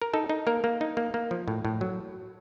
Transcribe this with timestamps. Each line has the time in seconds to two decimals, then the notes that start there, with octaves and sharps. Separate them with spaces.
0.02 A#4
0.13 D#4 A4
0.29 D#4
0.47 A#3 A#4
0.64 A#3
0.81 D#4
0.97 A#3
1.14 A#3
1.31 F3
1.48 A2
1.65 A2
1.81 F#3